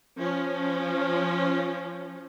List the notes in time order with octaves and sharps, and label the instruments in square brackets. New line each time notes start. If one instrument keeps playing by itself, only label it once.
[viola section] F3 C#4